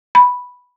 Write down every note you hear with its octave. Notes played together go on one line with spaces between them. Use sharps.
B5